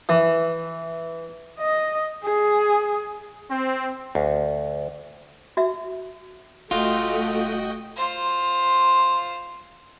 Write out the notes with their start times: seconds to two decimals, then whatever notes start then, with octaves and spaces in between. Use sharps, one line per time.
0.09 E3
1.58 D#5
2.24 G#4
3.50 C4
4.15 D2
5.57 F#4 E5
6.71 D#1 A3 F4 F#4 D#5 G5
7.97 F4 C5